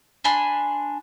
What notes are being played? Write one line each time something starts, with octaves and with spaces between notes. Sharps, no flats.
D4 G#5 B5 C6